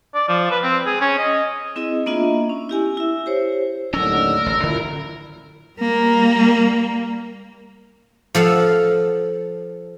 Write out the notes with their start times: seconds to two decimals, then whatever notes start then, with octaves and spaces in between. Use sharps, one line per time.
0.14 D5
0.28 F3
0.51 B4
0.63 C4
0.86 G#4
1.01 C#4
1.18 D#5
1.76 C4 E4 G#4 D#5
2.06 A#3 B3 D4 F4 D#5 E5
2.49 C#4
2.70 E4 G4 G#5
2.97 E4 E5
3.26 G4 C5 C#5
3.94 D#2 A2 D3 F#3 C#4 A#4 E6
4.46 A1
4.63 F#2 A#2 D3 E4
5.79 G3 A#3
8.35 F3 A4 F5 F#5